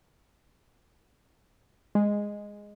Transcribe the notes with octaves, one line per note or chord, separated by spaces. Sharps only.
G#3